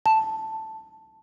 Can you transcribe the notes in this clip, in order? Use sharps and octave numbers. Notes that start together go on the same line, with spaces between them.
A5